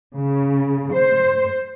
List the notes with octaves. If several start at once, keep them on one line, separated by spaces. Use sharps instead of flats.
C#3
C5